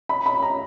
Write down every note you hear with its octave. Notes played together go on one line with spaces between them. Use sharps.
B5
B5
A#5